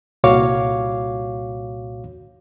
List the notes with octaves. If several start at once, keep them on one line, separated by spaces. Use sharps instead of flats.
C2 A#2 F#4 C#5 F5 D6